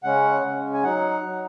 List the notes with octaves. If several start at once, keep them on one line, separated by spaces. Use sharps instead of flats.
C#3 G#3 C#4 F#5
C#3 G#3 C#4
G#5
F#3 D#4 F#5
F#3 D#4